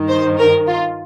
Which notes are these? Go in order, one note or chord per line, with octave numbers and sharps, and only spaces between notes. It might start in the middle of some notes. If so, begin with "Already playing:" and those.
Already playing: G2 D#3
C5
A#4
F4